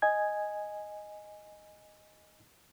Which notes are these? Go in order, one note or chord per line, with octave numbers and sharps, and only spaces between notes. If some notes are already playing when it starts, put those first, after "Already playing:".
D#5 G#5 G#6